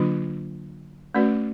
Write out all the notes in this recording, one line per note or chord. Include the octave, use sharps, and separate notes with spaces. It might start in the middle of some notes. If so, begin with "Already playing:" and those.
Already playing: D3 F#3 A#3 D4 F4
A3 C#4 F#4 B4 D5